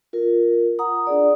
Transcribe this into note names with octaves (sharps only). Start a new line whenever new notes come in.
F4 A#4
F#5 A#5 D#6
D4 G#4 D5